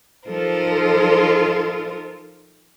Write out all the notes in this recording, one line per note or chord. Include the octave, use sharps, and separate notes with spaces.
F3 D#4 F4 A4 A#4 C5